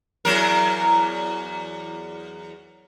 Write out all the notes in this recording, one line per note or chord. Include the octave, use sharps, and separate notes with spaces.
E2 F#3 A#4